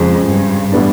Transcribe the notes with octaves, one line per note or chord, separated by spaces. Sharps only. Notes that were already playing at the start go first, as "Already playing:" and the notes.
Already playing: F2 C#3 F3 G#3 C4
G2
A2 E3 G3 B3 D4